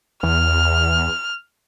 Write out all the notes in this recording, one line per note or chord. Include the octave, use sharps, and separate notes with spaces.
E2 F6